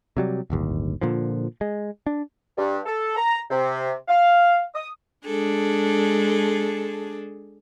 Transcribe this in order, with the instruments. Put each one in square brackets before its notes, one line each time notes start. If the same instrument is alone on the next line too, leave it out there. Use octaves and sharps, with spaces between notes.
[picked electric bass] C3 F#3 G3
D1 G1 D#2
A#2 D3 F3
G#3
D4
[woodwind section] G2
A4
A#5
C3
F5
D#6
[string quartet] G#3 D4 G#4 A4